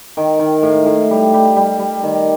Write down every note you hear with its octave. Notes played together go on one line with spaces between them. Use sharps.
D#3
D#3
A2
A2
G3
G3
G3
G3
D#3